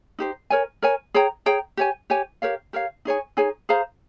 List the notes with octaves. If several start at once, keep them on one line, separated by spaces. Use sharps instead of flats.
D#4 G4 C5
A#4 C#5 G#5
A#4 C#5 G#5
G#4 C#5 G5 A#5
G#4 C#5 G5 A#5
G4 C#5 G#5
G4 C#5 G#5
G4 A#4 C#5 F5
G4 A#4 C#5 F5
D#4 G#4 C#5 G#5
D#4 G#4 C#5 G#5
G#4 C5 F5 A#5